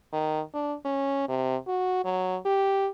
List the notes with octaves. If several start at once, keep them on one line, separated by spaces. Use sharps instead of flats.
D#3
D4
C#4
C3
F#4
F#3
G4